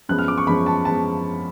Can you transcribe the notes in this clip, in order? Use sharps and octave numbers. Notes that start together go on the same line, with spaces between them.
F#2 F3 G#3 B3 F#6
F6
D6
C#6
F#2 F3 G#3 B3 B5
A5
F3 G#3 B3 A5